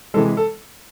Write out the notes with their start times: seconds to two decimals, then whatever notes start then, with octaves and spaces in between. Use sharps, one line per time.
0.14 C3 E3 G#3 A4
0.37 A4